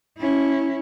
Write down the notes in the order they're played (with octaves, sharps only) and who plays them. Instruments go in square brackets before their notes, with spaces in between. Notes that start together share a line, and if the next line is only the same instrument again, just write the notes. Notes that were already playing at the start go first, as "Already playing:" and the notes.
[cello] C#4 E4